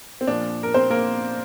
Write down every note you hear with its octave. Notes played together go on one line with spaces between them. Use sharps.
C4
A#2 F3 D4
A#4
C4 C5
A#3 A#4